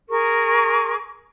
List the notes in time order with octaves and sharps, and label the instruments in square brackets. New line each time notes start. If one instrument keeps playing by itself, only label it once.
[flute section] G#4 A#4 C#6